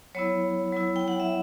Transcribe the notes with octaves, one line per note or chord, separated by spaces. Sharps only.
F#3 B3 E4 C#5
F#3 B3 E4
G5
F#5
E5